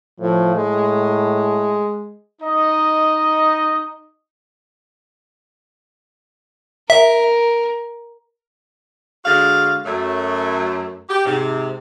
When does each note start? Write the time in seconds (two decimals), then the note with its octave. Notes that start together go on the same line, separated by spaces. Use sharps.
0.20 A2 F3
0.55 A2 G#3
2.41 D#4 D#5
6.90 A#4 E5
9.25 D3 G#3 F#4 F5
9.85 F#2 A3
11.09 G4
11.26 G#2 C3